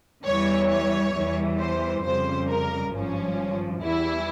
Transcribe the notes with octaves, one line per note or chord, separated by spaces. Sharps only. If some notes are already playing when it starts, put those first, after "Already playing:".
E2 E3 G3 C#5
C#5
E2 E3 G3
C5
F2 C#3 G3 C5
A#4
G#1 G2 F3 C#4
E2 E3 G3 E4